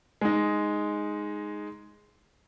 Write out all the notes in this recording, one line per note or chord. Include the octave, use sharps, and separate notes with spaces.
G#3 D#4